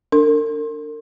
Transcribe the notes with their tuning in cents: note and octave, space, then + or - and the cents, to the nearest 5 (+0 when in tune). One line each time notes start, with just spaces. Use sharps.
D4 +5 A#4 -40